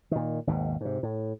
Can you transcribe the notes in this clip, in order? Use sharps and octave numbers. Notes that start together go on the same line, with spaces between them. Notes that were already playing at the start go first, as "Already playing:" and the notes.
A#2 D#3
G#1 D#2 B2
G#2 C3
A2